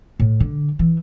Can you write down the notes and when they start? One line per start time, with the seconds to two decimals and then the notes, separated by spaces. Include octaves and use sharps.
0.19 A2
0.40 D3
0.79 E3